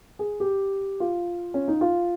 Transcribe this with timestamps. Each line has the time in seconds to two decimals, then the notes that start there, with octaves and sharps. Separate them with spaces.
0.19 G#4
0.40 G4
1.00 F4
1.54 C#4
1.68 D#4
1.81 F4